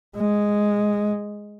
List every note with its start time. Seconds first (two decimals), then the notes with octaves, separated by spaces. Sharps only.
0.17 G#3